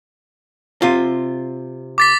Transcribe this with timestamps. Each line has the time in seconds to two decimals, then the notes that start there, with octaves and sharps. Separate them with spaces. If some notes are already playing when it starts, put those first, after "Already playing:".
0.82 C3 F4
1.98 D6 A6 B6